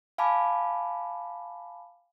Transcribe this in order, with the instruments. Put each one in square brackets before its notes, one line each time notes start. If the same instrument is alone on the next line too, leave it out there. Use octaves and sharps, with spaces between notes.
[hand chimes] F5 G#5 A5 B5 D6